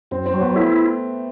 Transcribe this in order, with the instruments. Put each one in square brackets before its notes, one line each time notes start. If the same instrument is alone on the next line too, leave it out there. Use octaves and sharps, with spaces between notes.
[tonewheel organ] F#2 [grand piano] C4
[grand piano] C4
[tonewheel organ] F#3
[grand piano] B3
[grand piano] A3 [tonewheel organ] E4